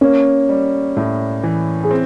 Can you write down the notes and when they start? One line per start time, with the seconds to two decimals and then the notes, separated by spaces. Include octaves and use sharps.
0.01 A#3 C#4
0.49 G3
0.97 A2
1.43 E3
1.83 G#4
1.91 C4